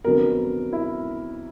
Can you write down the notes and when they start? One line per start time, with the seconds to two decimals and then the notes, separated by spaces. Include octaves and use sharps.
0.04 F2 D3 F#3 B3 A#4
0.73 E4